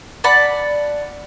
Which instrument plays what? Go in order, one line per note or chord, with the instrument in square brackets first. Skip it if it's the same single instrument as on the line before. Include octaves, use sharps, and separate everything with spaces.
[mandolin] D5 F#5 A5 B5